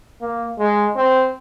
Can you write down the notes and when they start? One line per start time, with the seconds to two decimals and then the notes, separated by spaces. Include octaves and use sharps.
0.21 A#3
0.59 G#3
0.96 C4